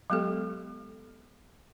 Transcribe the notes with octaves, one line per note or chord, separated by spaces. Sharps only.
F#3 G#3 B3 G4 A4